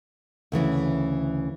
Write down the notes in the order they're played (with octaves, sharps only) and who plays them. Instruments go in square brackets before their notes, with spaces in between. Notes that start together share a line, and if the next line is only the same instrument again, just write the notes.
[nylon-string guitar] D2 C#3 E3 C#4